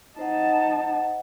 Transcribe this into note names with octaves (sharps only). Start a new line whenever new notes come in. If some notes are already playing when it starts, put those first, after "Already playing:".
D#4 C5 D#5 F#5 A5